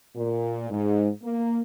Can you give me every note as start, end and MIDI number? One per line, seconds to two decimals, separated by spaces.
0.16 0.68 46
0.70 1.08 44
1.23 1.62 58